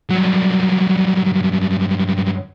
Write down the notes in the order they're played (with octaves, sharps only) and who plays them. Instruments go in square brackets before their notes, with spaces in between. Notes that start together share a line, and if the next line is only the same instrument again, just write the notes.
[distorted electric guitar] G2 F#3